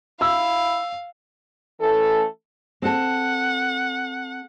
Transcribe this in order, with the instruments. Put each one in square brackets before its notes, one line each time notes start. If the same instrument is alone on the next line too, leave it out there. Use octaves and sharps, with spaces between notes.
[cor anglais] E4 [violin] F5 [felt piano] E6
[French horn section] E3 A3 C#4 A4
[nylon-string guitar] C4 A4 [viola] F#5